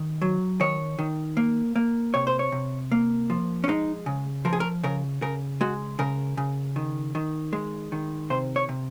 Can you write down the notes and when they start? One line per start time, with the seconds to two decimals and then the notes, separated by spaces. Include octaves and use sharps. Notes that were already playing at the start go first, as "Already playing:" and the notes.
Already playing: D#3
0.22 F#3
0.60 D#3 C#5
0.99 D#3
1.37 A#3
1.76 A#3
2.14 C3 C#5
2.27 C5
2.39 C#5
2.52 C3
2.92 A#3
3.30 F3
3.64 C#4
3.68 G#3 D#4
4.06 C#3
4.45 F3 A#4
4.53 G#4
4.60 A#4
4.83 C#3 A#4
5.22 C#3 A#4
5.61 G#3 F#4
5.99 C#3 A#4
6.37 C#3
6.76 D#3
7.15 D#3
7.53 G#3
7.92 D#3
8.30 C3 C5
8.56 C#5
8.69 C3